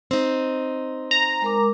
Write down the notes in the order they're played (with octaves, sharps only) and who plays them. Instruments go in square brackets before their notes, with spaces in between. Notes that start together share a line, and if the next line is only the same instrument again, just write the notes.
[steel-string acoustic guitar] C4 D#4
[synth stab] A#5
[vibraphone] G#3 A#4 D6